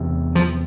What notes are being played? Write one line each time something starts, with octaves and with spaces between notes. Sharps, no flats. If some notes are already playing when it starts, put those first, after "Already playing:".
Already playing: E2 C3
F3